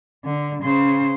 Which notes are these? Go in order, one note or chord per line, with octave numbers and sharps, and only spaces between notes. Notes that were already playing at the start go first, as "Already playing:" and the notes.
D3
C#3 C5